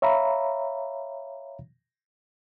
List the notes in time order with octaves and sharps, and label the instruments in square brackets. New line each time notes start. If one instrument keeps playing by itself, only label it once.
[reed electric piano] C#5 E5 F5 A#5 B5